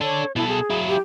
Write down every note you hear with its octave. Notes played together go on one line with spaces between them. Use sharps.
D4 A4 C#5
B2 E4 A4
G#4
F#3 E4
G4